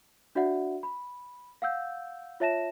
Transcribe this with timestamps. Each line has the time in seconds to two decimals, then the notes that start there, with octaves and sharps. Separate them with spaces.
0.35 D4 F#4 D5 E5 F#5
0.83 B5
1.62 F5 F#5 E6 G6
2.40 F4 C#5 E5 A5 A#6 E7